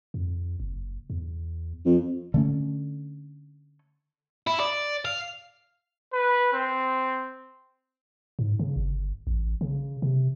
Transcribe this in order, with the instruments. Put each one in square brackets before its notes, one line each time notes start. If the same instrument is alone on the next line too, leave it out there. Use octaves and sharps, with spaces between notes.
[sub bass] F2
F#1
E2
[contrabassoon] F2
[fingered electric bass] D3 A3 C#4
[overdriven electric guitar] E4
D5
F5
[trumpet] B4
C4
[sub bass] G#2
C#3
G1
A1
C#3
C3